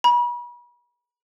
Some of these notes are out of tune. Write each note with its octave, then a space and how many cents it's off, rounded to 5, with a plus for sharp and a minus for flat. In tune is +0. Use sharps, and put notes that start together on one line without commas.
B5 -40